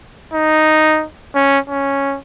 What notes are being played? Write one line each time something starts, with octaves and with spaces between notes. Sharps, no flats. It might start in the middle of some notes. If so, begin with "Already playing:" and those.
D#4
C#4
C#4